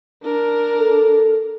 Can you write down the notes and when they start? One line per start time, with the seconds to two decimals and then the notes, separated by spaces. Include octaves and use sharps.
0.23 D4 A#4
0.79 A4